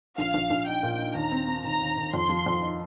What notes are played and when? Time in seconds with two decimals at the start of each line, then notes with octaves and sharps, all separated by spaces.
0.18 A#1 F5
0.34 A#1
0.50 A#1
0.67 D#4 G5
0.83 A#2
0.99 D#4
1.15 D#2 A#5
1.31 C4
1.48 C4
1.64 D#2 A#5
1.81 D#2
1.97 D#2
2.13 F2 C6
2.29 F3
2.46 F2
2.62 D#4